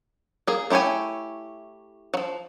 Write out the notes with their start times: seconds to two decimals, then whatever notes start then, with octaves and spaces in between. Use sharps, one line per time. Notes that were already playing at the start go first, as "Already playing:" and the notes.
0.47 A#3 G#4
0.70 A3 E4 G4 C#5 G#5
2.14 F3 F#3